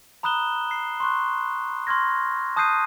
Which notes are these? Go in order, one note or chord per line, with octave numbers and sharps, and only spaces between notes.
A#5 B5 D#6 F#6 E7 G7
C7
C6 C#6 F#6
C6 C#6 F6 G#6 A#6
A5 D#6 F#6 G6 C7 D#7